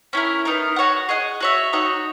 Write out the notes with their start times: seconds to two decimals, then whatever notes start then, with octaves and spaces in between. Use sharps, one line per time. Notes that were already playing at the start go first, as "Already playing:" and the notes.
0.13 C#4 E4 A#4
0.45 B3 D#4 A#4
0.76 F#4 C#5 F#5
1.09 G#4 D#5 F#5
1.40 F#4 C#5 E5
1.73 D#4 F#4 C#5